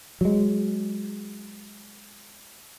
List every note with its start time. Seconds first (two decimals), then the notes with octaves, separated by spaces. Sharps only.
0.21 F#3 G#3